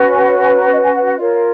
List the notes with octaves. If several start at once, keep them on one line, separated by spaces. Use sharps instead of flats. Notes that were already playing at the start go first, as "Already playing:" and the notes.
Already playing: C#4 F#4 B4
G#5
F#5
G#5
A#5
D#5
G#5
F#5
F#5
F4 A#4 C#5 D#5
F5